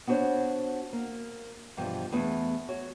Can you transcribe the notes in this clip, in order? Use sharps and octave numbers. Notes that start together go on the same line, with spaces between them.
B3 D4 F#4 C5 C#5 F#5
A#3
E2 G2 B2 F3
E2 A3 B3 G#4 A5
F#4 C#5